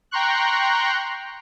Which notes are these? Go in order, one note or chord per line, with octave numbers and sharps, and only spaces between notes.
G5 A#5 C6 C#6 F#6